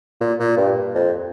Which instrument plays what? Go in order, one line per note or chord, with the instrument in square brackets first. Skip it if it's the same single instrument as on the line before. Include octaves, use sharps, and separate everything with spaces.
[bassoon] A#2
A#2
G2
F2